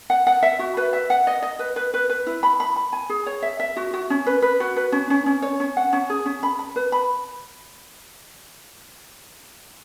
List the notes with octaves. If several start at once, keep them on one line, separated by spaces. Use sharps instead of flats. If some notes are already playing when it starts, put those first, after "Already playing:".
F#5
F#5
E5
F#4
B4
E5
F#5
D#5
D#5
B4
B4
B4
B4
E4
B5
B5
B5
G#5
G#4
C#5
E5
E5
F#4
F#4
C#4
B4
B4
F#4
B4
C#4
C#4
C#4
C#5
C#4
F#5
C#4
G#4
C#4
B5
B5
B4
B5